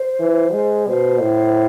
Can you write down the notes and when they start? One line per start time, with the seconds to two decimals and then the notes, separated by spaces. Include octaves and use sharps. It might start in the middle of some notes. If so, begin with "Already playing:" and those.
Already playing: C5
0.20 E3
0.53 G#3
0.87 B2 C5
1.21 A2